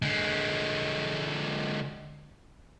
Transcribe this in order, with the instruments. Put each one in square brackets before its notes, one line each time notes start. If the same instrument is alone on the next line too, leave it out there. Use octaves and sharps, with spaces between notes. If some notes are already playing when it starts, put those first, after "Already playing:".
[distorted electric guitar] D3 G#3